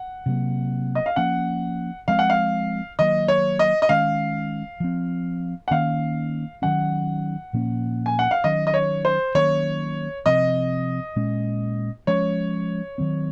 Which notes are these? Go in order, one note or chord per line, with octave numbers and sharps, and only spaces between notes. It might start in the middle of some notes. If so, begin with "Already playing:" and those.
Already playing: F#5
C3 F#3 A#3
D#5
F5
F3 A#3 C#4 F#5
F3 G#3 C4 F5
F#5
F5
D#3 F#3 A#3 D#5
C#5
D#5
D#5
D#3 G#3 C#4 F5
F3 C4
F#5
D#3 A#3 C#4 F5
D#3 F#3 C#4 F#5
A#2 F3 A#3 C#4
G#5
F#5
F5
D#3 F#3 C#4 D#5
D#5
C#5
C5
D#3 F#3 A#3 C#4 C#5
C3 F3 C4 D#5
A#2 G#3 C#4
F3 G#3 C#4 C#5
D#3 F#3 C4